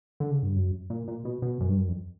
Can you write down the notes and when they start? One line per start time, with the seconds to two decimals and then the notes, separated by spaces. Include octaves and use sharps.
0.20 D3
0.31 C#3
0.43 G2
0.55 F#2
0.90 A#2
1.08 A#2
1.25 B2
1.42 B2
1.60 F#2
1.69 G2
1.77 F#2
1.87 F2